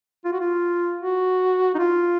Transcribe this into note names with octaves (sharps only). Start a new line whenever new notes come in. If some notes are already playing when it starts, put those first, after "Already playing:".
F4
F#4
F4
F#4
D#4
F4